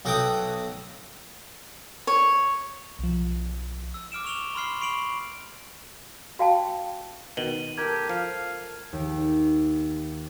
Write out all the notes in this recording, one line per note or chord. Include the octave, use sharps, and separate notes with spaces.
B1 F#4 A4 G5 D6 D#6
C#5
B1 F3
E6
D6 F6 D7 E7
C#6 F7 G7
B5 C6 F6 C7 G7
B5 C#6 C7 D7 F7 F#7
F#4 F5 G5 A5
B2 D#3 D#7 F#7 G7
G4 A4 A#4 G#6
F3 F5
D#2